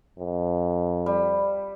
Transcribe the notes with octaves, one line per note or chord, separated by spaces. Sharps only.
F2
G3